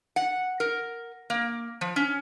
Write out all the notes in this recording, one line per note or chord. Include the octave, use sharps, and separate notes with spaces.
F#5
A#4
A#3
F3
C#4